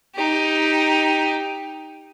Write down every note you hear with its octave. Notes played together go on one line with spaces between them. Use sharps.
D#4 G4